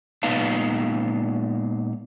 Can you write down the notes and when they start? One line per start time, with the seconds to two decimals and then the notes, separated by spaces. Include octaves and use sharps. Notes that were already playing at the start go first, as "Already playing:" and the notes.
0.23 A#2 G#3 B3 D#4 F5 A5